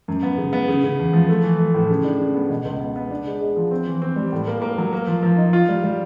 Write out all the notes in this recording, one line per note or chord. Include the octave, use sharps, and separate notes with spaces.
F#2
B3
C#3
B3
C#3
C#3
E2
F3
A3
E3
A3
A2
C#3
D4
C#3
B3
B2
C#2
B3
B3
D4
G#3
G#3
F3
C4
E3
C4
G3
A2
A#3
A#3
F#3
A#3
F3
F3
D#4
F4
G3
G3